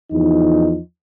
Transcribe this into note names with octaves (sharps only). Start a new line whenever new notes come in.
E2 F3 D#4